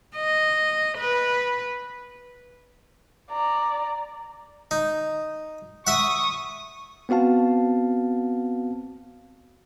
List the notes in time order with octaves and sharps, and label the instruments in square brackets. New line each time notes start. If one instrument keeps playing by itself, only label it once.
[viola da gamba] D#5
B4
[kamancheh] D5 A#5
[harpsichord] D#4
[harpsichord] E5 F#5 [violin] C#6 D#6
[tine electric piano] B3 C4 F#4 F5 A5